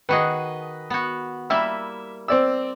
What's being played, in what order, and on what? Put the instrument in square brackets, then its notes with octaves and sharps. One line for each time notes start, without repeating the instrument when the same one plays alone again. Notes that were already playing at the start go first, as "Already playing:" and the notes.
[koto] D#3 F#4 G#4 [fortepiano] B4 D#5
[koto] B3 F#4
[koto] G3 A#3 E4 [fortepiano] E5
[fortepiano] C4 D5 E6